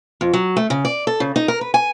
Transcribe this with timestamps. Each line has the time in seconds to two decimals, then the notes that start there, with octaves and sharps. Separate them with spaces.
0.21 F2
0.34 F#3
0.57 A3
0.70 C#3
0.85 D5
1.07 A4
1.20 C#3
1.36 D#4
1.48 A#4
1.61 B4
1.74 G#5